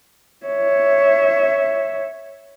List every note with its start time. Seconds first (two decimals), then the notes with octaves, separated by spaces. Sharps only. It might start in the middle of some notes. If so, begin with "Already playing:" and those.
0.46 C#5 E5